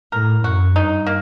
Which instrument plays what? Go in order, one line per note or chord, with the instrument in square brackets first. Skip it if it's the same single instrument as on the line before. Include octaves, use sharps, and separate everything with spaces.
[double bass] A2 [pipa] A#4
[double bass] F#2 [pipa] F#4
[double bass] G2 [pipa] D#4
[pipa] A#3